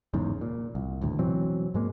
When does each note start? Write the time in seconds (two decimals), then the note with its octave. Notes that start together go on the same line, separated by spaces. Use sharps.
0.14 F1 E2 G#2 C#3
0.41 A#2
0.75 C2
1.01 D#1 D2 A2
1.19 E1 E3 F#3 C4
1.74 G#2 G#3 A#3